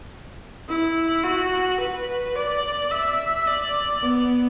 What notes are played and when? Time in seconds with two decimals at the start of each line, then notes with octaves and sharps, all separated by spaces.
0.69 E4
1.24 F#4
1.80 B4
2.36 D5
2.91 E5
3.47 D5
4.02 B3